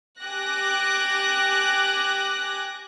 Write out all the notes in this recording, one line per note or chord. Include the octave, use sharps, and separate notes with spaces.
G4 G#5 D6 F#6 A#6